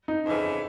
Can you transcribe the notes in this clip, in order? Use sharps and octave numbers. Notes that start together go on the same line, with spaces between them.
D#4
F2 C#3 E3